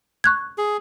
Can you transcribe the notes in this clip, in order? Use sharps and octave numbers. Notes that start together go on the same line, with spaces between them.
C#6 F#6 G#6
G#4